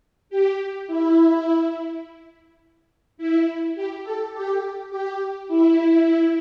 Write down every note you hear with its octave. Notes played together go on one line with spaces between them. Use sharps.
G4
E4
E4
G4
A4
G4
G4
E4